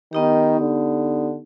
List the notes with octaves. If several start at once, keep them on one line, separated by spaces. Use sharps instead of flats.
D#3 B3 D#4 G4
D3